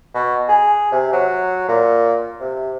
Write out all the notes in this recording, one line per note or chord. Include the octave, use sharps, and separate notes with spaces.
B2
G#4
C3
F#3
A#2
C3